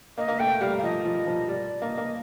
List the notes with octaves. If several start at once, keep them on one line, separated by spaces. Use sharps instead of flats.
A#3 D#5
A#3
A3 G5
G3 F5
F5
F3 D#5
F3
F3
G3 D5
A#3 D#5
A#3